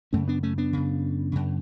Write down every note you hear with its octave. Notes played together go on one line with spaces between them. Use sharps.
F#2 C#3 A3 C#4
B3 D4
A3 C#4
B3 D4
F#2 C#3
F#2 C#3